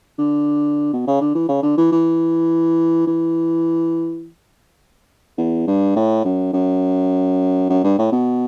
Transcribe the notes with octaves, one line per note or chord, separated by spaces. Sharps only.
D3
B2
C#3
D3
E3
C#3
D3
E3
E3
E3
E2
G2
A2
F#2
F#2
F#2
G2
A2
B2